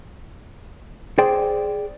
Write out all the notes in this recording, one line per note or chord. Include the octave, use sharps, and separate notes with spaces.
G#4 C5 D5 G5